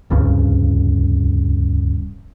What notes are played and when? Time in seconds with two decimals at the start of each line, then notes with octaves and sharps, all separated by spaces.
0.10 D1 C2 G2 C#3